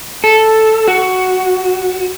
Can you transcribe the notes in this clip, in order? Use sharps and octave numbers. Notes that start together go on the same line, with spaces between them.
A4
F#4